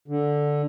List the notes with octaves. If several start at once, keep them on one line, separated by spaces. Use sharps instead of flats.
D3